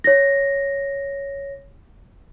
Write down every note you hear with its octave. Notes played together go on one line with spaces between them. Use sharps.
C#5 A#6